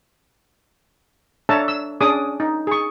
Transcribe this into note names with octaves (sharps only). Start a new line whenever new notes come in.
D4 A4 C#5 E5 A5 A#5
E6
C#4 D4 G#4 D6 D#6
D#4
G#4 C#6